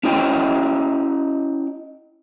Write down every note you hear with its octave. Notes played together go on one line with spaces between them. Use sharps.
C#4 E4 F#4 C#5 D#5 G5